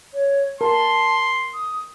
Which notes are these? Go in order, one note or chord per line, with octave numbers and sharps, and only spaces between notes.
C#5
A#4 A5 C6
D#6